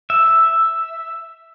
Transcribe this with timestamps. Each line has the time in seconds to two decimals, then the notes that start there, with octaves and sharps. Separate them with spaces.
0.10 E5